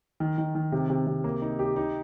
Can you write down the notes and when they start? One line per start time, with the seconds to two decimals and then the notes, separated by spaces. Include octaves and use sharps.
0.20 D#3
0.38 D#3
0.55 D#3
0.72 C3
0.90 C3
1.07 C3
1.24 A#3
1.42 D#4
1.59 G4
1.76 D#4